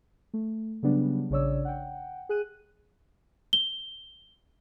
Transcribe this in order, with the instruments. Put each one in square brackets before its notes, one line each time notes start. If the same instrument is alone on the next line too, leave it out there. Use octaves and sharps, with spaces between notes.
[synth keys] A3
C#3 F#3 G3 B3 D4
A#1 C#3 D4 C#5 D5 E6
F#5 G5
G#4 F#6 D#7
[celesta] G7